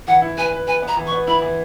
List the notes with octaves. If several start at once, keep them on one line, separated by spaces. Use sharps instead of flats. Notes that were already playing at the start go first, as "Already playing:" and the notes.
E3 F#5
E4
B4 G#5
B4
B4 G#5
B3
A#5
E3
C#6
B3
E4 B5
E3